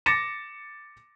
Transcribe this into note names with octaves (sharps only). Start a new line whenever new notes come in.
D6 A6 A#6 C#7 E7